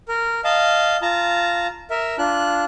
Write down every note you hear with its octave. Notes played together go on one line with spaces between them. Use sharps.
A#4
D#5 F5 A5
F4 A5 A#5
A#4 E5
D4 F4 F#6